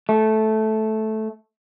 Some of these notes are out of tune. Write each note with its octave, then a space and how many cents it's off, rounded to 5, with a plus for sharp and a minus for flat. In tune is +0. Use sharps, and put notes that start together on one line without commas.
A3 -10